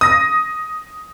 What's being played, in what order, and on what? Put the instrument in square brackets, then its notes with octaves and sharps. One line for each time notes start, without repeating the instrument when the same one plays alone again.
[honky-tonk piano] D#6 A#6